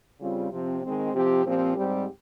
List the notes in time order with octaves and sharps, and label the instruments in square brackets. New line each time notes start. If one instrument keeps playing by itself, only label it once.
[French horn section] C#3 G3 C4 F4
C3 F3 C4
D#3 G#3 C4
C3 F3 C4 G4
A#2 F3 C4 G4
G#2 G3 C4 G4